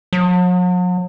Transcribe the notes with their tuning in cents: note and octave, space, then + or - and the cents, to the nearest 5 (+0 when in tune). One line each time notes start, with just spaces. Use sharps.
F#3 -45